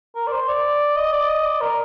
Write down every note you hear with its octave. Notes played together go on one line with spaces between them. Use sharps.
A#4
D5
C5
D5
D#5
D5
D#5
D5
A#4